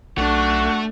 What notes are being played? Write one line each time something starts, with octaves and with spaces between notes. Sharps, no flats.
B1 A3 D4 F#4